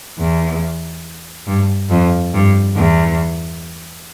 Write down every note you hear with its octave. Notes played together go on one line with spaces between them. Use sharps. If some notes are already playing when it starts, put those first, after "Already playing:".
E2
G2
F2
G2
E2